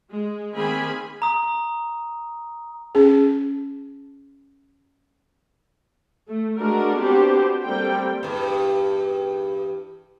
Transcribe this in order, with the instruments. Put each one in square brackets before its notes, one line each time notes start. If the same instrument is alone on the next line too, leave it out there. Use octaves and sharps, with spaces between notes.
[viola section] G#3
D#3 A#3 C4 G#4 G#5 B5
[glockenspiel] A#5 D#6
[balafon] C#4 G#4
[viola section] A3
G#3 A3 D4 F#4 A#4
B3 C4 D4 F#4 G4 C5
G3 A#3 C4 A4 G5
[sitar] E2 G2